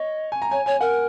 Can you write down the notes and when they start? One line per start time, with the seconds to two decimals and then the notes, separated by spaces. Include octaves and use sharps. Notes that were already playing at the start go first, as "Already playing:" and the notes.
Already playing: C#5 D#5
0.32 G#5
0.42 A#5
0.51 C#5 G#5
0.66 C#5 G#5
0.81 A#4 F#5